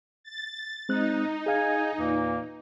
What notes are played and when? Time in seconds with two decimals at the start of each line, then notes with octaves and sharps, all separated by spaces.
0.24 A6
0.89 G#3 C4 D#4 F#6
1.46 G#4 F5 G#5
1.98 E2 A#2 E3 A#3